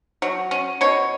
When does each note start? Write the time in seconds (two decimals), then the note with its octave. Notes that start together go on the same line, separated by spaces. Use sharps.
0.22 F#3
0.51 C#4
0.81 B2 C#5